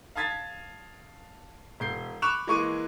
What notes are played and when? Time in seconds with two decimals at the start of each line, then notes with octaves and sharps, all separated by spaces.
0.15 F5 A5 D#6 G#6 A6 B6
1.80 E1 G6 C7
2.22 B5 C#6 D6 F#6 E7 F7
2.47 E3 G#3 A#3 C#6 D6 D#7